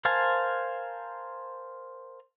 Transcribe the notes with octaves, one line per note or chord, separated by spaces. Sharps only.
A#4 C5 F5 G#5 A5